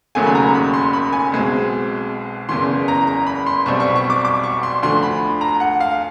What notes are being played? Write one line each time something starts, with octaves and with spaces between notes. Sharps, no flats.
E1 D#2 C#3 F#3 A3 G#5
B5
A#5
B5
C6
B5
G#5
B1 B2 G#3 C4
F#1 E2 C#3 E3 C6
A#5
A#5
B5
C6
B1 B2 G3 C4 C#6
C#6
C#6
D6
D6
C#6
C6
D2 D3 F3 C6
B5
A#5
F#5
F5